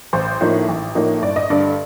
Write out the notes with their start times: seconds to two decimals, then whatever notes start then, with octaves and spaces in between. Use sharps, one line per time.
0.13 A1 C5
0.41 A2 F3 A#3 D#4
0.69 A1
0.95 A2 F3 A#3 D#4
1.22 G1 D5
1.36 D#5
1.50 G2 D3 A3 D5